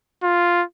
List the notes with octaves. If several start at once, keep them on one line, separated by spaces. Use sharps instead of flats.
F4